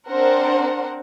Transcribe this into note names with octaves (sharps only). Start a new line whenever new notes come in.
C4 D4 A#4 C5 F#5